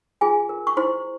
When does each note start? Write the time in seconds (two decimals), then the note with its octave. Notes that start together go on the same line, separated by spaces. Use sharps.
0.21 F4 G#4 G#5
0.49 A#4
0.67 C#6
0.77 E4 C5 C6